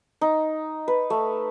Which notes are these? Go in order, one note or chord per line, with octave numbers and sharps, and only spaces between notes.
D#4
B4
A3